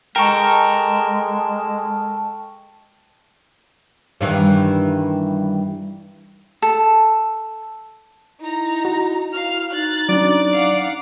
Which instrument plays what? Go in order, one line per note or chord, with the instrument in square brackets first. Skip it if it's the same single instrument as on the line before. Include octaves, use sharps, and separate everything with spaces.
[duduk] G#3 [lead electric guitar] A4 A#4 [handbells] G5 C#6
[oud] G2 D#3 E3
[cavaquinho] A4
[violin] D#4 A#5 [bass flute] E4
[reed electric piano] F#4
[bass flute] E4 [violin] F5 F6
[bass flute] D#4 [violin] F#6 A6
[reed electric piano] F#3 C#4 D4 [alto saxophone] D5
[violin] F5 F#5